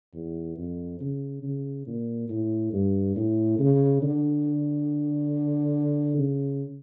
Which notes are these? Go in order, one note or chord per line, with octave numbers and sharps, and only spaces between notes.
E2
F2
C#3
C#3
A#2
A2
G2
A2
C#3
D3
C#3